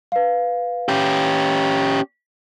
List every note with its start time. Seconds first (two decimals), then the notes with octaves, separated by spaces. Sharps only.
0.12 B4 F5
0.89 C#4 G4